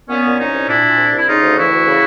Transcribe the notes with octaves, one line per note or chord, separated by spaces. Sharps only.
A#2 B3 C#4
A#2
C2 C#4 D#4
C2
A#2 D4 E4
A#2
C2
C2 E4
C#3 D#4 F4
D2
E3 E4 F#4
D2
C#3